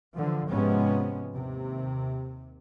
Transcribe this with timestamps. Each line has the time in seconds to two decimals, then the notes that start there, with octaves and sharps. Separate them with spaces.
0.14 D3 E3 F3
0.49 G#2 C3 F3 G#3 B3 C#4
1.32 D#2 C3